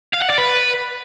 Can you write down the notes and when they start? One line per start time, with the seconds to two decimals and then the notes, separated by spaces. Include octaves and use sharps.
0.14 F5
0.22 F#5
0.30 D5
0.38 B4